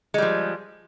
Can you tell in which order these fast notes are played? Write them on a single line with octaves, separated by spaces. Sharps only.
G#3 G3 F3